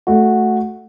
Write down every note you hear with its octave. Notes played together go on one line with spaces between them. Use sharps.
A3 F#4